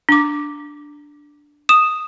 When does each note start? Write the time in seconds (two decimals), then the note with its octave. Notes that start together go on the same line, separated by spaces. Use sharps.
0.09 D4 D6
1.69 D#6 E7